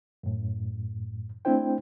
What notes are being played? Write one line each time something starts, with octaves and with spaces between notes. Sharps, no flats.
F#2 A2
A3 C4 D4 E4 C5 G5